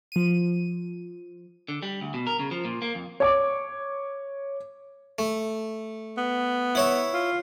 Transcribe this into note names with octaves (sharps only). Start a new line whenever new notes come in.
F3 D#7
D3
G3
D2
B2
A#4
C#3
F3
A#2
A#3
F2
C#5 D6
A3
B3
E4 C#5 E5
F4